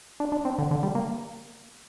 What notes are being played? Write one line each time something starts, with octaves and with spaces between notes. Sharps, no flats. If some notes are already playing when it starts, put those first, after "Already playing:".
D4
D4
C4
D3
D3
G3
A#3